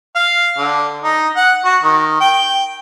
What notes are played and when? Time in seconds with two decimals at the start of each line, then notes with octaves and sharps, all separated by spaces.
0.16 F5
0.58 D3
1.04 D#4
1.36 F#5
1.65 F#4
1.83 D#3
2.20 G5